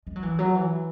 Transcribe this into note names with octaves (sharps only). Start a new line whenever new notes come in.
G#3
F#3
E3
F#3
E3